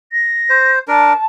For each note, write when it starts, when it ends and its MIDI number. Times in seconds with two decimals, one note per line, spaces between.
0.12 0.71 94
0.50 0.79 72
0.88 1.13 62
0.88 1.13 70
0.88 1.25 81